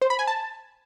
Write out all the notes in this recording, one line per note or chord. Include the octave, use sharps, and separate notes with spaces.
C5
B5
G#5
A5